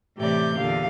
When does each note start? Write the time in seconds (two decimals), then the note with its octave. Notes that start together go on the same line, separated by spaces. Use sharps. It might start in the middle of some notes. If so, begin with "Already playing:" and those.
0.17 A2 C3 E3 G4 D5 G6
0.57 E2 A#2 D3 G4 F5